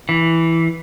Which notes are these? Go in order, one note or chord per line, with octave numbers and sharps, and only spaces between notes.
E3